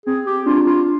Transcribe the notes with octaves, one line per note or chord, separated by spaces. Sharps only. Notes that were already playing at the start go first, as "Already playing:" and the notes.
C4 G#4
G4
D4 F4
F4